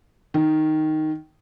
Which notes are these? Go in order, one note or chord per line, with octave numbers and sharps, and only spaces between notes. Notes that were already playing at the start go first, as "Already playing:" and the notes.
D#3